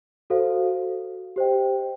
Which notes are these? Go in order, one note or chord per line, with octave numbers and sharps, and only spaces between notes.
F#4 A4 C5 F5
G4 C5 D#5 G5